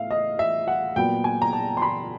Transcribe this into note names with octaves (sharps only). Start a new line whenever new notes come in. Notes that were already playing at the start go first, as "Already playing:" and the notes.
Already playing: A2 B3 E5 F5
D#5
E5
F#5
A#2 F#3 B3 G5
G#5
A#5
A5
C6
B5